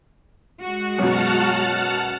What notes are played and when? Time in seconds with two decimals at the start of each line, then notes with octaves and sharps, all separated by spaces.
0.61 G#3 F#4
0.98 F#2 B2 F#5 A5 F6